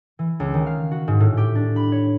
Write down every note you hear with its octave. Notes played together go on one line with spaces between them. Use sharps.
E3
C#2
D#3
F5
F#4
G#2
A2
G4
D4
B5
C#5